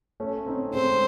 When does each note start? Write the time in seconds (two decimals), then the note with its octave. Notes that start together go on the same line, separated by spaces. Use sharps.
0.20 A3 C#4
0.46 C4 D#4
0.73 G#3 C4 C5